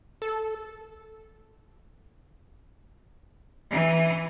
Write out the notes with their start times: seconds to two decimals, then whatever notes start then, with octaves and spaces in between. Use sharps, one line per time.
0.22 A4
3.71 E3